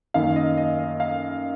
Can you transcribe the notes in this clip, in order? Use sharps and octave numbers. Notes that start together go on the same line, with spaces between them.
F#2 D#3 A#3 F5
D#5
D#5
D#5
F5